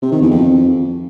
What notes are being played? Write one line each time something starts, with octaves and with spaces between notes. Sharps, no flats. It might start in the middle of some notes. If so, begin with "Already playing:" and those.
C3
D#3
E2
F2